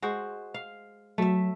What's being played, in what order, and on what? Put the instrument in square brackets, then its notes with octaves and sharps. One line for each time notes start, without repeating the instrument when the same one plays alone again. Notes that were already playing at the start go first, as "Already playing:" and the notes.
[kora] G#3 F#4 C5
F5
[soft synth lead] F#3 [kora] A3 E5